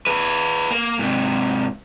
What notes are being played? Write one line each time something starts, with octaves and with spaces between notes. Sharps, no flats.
G#4 B4
A#3
G#2 C3